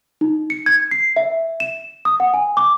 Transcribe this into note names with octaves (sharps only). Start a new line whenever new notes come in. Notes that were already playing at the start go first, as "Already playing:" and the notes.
D#4
C#7
G#6
C7
E5
E7
D#6
F#5
G#5
D6